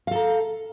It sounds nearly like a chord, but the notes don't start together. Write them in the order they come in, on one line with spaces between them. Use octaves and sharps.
F5 A4 A#5